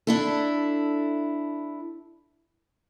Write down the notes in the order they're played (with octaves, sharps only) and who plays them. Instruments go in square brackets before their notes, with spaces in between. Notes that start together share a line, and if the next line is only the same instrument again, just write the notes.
[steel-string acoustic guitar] D4 E4 A4